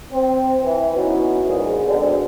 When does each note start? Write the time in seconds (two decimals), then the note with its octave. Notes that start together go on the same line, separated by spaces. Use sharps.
0.12 C4
0.62 E3
0.96 B3 C#4 D#4 E4 F#4
1.46 A#1 G#2 G#4
1.85 B2 D3 G#3 C4 D4 G#4